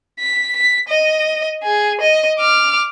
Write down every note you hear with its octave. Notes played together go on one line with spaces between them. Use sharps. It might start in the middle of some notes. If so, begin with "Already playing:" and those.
B6
B6
D#5
G#4
D#5
D6 F6